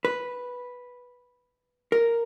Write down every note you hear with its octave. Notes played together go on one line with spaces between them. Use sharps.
B4
A#4